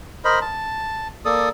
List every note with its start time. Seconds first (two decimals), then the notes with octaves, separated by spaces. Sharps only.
0.25 A#4 C5 D#5 B5
0.42 A5
1.25 A#3 A4 D5 D#6